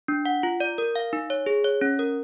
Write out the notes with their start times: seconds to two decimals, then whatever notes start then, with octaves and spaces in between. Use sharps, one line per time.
0.08 D4
0.26 F#5
0.43 F4
0.60 D5
0.78 A#4
0.96 F5
1.13 D#4
1.30 C#5
1.46 G#4
1.65 C#5
1.81 C#4
1.99 A#4